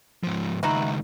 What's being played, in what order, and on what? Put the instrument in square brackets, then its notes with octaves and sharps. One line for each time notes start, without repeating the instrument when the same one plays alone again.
[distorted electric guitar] G#2 F3
[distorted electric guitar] C#2 D#3 [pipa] D#4 E4 F#4